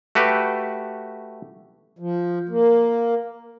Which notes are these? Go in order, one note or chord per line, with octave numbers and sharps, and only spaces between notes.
A3 F#4 G4 B4
F3
A#3